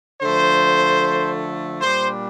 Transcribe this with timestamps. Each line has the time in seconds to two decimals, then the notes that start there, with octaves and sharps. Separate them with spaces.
0.22 D3 F3 A3 C5
1.81 A#2 G3 D4 C5